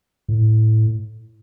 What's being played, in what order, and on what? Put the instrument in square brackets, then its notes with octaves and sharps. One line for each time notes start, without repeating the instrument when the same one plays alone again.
[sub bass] A2